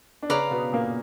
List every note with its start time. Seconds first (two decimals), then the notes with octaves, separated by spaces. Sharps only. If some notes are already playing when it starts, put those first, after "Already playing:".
0.22 D4
0.29 C#3 C#4 B4 D5 F5 A#5
0.51 B2 B3
0.72 A#2 A#3